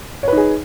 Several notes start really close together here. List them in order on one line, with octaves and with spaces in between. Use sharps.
C#5 B4 D#4 G#4